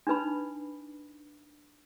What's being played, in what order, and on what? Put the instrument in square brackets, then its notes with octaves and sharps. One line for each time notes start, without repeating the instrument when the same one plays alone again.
[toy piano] D4 D#4 B4 B5